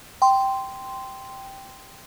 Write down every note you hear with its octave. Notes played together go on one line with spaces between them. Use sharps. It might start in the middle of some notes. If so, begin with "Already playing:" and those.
G5 C6